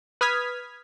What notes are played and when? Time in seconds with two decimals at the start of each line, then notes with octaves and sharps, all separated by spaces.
0.21 B4 D#6 F6 G#6 B6